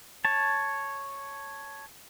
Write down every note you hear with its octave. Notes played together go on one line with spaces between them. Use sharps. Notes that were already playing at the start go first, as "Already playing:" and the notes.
C#5 A5